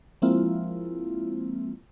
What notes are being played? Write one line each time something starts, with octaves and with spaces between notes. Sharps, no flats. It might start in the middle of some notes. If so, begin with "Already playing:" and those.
F3 G#3 A#3 C4 E4 F4